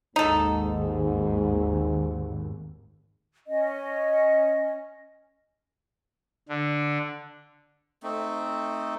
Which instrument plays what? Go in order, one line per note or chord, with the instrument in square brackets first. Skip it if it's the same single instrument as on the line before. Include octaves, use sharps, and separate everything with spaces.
[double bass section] G#1 D#2 [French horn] G#2 [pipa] D#4 A4
[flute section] C#4 D#5
[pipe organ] D3
[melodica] A3 C4 D#4